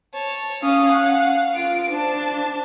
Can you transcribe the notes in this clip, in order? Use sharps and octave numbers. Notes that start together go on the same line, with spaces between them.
C#5 A5
C#4 F5 D#6
F#5
F4 D7
D4 C5 A5